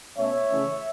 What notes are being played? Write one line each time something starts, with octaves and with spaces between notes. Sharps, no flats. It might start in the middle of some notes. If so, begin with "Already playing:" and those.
B2 A3 C#4 C#5 E5
C#3 E3 A3 C#4